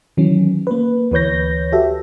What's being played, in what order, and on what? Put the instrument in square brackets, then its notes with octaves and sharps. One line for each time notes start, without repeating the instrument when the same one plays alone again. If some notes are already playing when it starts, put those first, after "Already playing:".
[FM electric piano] D#3 E3 F#3 C#4
A#3 B4
D2 E3 B4 C#5 G6 A#6
F#4 G4 A4 E5